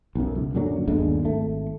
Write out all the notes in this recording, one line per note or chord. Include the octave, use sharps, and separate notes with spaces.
B1 F#2
C#2
F#2 A#2 D3 F#3
G1 D#2 D3 G#3
G#1 A3